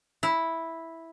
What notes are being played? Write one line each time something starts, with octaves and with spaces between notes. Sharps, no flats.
E4